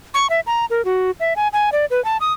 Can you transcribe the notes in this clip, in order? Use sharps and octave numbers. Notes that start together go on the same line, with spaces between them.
C#6
E5
A#5
A#4
F#4
E5
G#5
G#5
D5
B4
A5
D#6